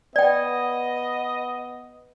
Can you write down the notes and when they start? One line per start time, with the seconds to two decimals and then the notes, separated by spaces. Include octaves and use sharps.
0.16 B3 D5 D#5 G5